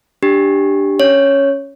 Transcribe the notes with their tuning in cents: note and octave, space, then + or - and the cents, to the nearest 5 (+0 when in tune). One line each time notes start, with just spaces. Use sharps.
D4 +0 G4 +0
C#4 +0 C#5 +0